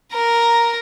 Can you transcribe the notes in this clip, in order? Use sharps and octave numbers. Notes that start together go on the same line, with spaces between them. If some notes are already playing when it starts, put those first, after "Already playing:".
A#4 A#5